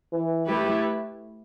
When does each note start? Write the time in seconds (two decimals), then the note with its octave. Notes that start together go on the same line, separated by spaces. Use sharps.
0.12 E3
0.48 A3 E4 G4 B4